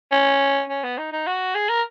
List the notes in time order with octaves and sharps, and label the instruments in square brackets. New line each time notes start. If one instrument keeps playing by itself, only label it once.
[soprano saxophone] C#4
C#4
B3
D#4
D#4
F#4
G#4
A#4